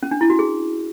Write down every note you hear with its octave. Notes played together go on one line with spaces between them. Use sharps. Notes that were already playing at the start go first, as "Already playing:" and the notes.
C#4
D4
E4
F#4
G#4